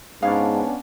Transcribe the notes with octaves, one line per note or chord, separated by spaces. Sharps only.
G#2 B3 C#4 D4 F5